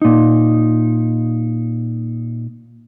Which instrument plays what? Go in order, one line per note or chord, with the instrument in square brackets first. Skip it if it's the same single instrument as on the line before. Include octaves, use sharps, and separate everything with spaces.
[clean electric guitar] A#2 D#4